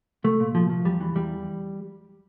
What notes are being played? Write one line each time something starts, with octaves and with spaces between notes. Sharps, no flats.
C2 A3
A#2
C2 F3
F3
E2 G3
E3
E2 G3